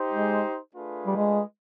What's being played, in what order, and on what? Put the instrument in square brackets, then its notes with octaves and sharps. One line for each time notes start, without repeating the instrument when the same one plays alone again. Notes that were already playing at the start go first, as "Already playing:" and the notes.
Already playing: [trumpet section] D#4 G4 C5
[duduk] G#3
[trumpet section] A3 D4 F4 G#4 B4
[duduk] G3
G#3